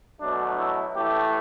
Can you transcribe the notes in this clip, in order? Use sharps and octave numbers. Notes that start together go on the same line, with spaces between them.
B2 F#3 A3 D4
E4
A2 E3 A3 G4